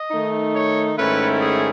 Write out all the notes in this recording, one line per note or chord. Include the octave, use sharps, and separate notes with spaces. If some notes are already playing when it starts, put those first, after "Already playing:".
Already playing: D#5
D#3 A3 D#4
C#5
G#2 D#3 A3 C#4 E4 B4
G#4